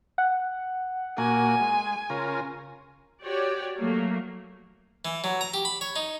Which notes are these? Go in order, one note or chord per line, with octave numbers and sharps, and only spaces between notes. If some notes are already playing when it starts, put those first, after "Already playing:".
F#5
A#2 A#3 F#4 G#5
G#3
C#3 F4 A#4
F#4 G4 C#5 D5
F#3 A3 A#3
E3
F#3
A#5
G4
B5
C#5
D#4